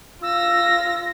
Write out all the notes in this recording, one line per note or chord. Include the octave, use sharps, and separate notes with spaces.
F4 E6 A#6